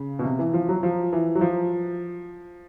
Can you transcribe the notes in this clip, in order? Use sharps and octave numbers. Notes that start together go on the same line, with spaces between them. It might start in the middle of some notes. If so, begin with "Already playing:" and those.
Already playing: C#3
B2
C3
E3
F3
F#3
F3
E3
F#3
F3